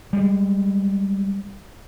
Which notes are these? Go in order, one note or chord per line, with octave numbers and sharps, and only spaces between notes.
G3 G#3